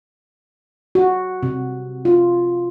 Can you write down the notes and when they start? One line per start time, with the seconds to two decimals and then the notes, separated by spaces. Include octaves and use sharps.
0.95 F#4
1.43 C3
2.05 F4